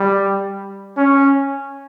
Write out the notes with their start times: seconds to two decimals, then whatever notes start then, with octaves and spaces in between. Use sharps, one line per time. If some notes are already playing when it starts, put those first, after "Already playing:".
Already playing: G3
0.97 C#4